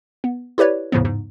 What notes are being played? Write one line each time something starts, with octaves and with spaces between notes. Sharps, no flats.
B3
E4 G4 B4 C#5 D5
E2 A2 C#3 F3 B3
G#2